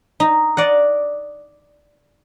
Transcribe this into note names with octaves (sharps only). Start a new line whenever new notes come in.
D#4
D5 D#5 F#5